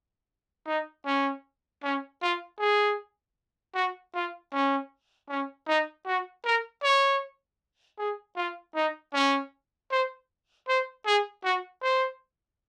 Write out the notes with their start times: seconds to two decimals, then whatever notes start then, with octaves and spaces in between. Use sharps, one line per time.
0.67 D#4
1.06 C#4
1.83 C#4
2.22 F4
2.59 G#4
3.75 F#4
4.14 F4
4.53 C#4
5.29 C#4
5.68 D#4
6.06 F#4
6.45 A#4
6.83 C#5
7.98 G#4
8.36 F4
8.75 D#4
9.14 C#4
9.91 C5
10.68 C5
11.06 G#4
11.44 F#4
11.83 C5